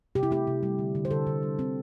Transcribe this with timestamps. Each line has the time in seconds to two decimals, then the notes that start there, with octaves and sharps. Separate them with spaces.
0.15 C3 G4
0.23 E4
0.31 A3 G4
0.47 C3
0.63 G3
0.79 D3
0.95 D3
1.05 C5
1.11 D3 A4
1.27 D3
1.43 G3
1.58 D3 C4